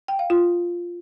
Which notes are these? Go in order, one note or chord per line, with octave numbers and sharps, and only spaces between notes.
G5
F5
F4